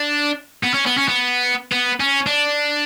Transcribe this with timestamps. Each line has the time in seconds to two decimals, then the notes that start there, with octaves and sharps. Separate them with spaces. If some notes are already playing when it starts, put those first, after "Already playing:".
Already playing: D4
0.63 B3
0.74 C#4
0.86 B3
0.98 C#4
1.08 B3
1.72 B3
2.00 C#4
2.27 D4